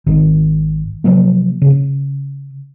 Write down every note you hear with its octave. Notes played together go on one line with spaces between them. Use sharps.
G#1 D#3
C3 F3 F#3 A#3
C#3